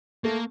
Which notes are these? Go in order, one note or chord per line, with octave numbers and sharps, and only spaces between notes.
A3 A#3